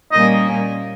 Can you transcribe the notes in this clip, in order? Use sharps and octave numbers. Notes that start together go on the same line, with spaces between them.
A#2 G3 A#3 C#4 D#5